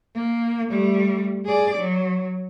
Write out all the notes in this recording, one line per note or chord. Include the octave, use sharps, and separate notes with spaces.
A#3
G3 A3
G#4 D5
F#3